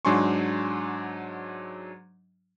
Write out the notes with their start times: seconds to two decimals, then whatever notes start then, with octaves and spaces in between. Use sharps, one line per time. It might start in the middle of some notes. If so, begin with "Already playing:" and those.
0.05 G#2 F#3 D4 G#5 C6 C#6